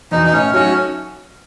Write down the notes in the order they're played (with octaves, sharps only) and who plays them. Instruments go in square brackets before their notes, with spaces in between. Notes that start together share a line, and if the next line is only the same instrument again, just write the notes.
[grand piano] E2 B2 [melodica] D#4
[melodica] D#4
[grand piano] A2 [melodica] C#4
[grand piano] F#3 A3 D#4 F#4 [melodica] C#4